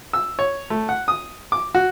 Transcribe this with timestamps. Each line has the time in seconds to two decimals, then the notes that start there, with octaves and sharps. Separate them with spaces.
0.13 E6
0.39 C#5
0.70 A3
0.89 F#5
1.08 D#6
1.52 D6
1.75 F#4